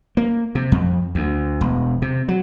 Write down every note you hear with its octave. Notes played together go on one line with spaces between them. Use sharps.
A#3
C3
F2
D2
E1
C3
F#3